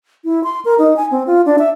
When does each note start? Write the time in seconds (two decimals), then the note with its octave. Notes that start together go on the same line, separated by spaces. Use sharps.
0.25 E4
0.44 C6
0.65 A#4
0.79 D#4
0.96 G#5
1.11 C4
1.27 F4
1.46 D4
1.59 E5